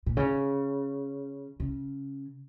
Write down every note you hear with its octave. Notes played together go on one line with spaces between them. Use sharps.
A#2
C#3
C#3